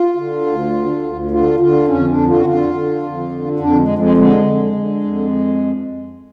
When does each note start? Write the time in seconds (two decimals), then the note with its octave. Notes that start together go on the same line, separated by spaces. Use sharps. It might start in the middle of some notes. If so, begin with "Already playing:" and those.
Already playing: F4
0.16 D3
0.46 D2
0.73 D3
1.02 D2
1.31 D3 F4
1.60 D3 F4
1.88 F2 C#4
2.08 D4
2.18 D3
2.27 F4
2.37 F#4
2.46 D3 F4
2.74 D3
3.03 F2
3.32 D3
3.60 F2 D4
3.79 G#3
3.88 F2
3.99 G#3
4.17 D3 G#3
4.46 D3
4.75 D3
5.04 F2